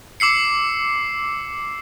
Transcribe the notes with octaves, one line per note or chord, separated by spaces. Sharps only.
D6 E6 C7 C#7